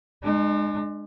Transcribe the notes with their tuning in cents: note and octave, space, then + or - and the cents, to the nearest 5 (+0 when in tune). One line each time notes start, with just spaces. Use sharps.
G#3 +0 D4 +45